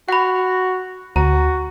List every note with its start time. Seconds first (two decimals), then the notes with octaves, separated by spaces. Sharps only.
0.09 F#4 F#5 B5
1.16 D2 F#4 A#5